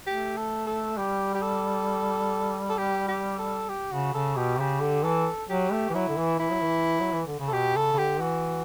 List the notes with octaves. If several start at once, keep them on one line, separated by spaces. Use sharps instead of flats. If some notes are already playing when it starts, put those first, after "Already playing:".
A3 G4
A4
A4
G3 G4
G4
A4
A4
G4
G4
A4
G4
C#3 F#4
C#3 A4
B2 G4
C#3 G4
D3
E3 A4
F#3 G4
A3
E3
F#3 E4
D3
E3
E3 E4
F#3
E3
F#3
E3
D3
C#3
A4
B2 G4
C#3 A4
C#3
D3 G4
E3 F#4